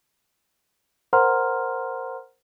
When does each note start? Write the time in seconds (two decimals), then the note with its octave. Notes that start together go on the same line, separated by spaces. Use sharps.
1.13 A#4 C5 F#5 A#5 C6 F6